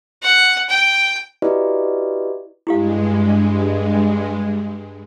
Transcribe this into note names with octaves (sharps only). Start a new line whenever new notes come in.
F#5
G5
E4 F#4 G4 B4 D5 D#5
G2 G#3 E4 G4 F5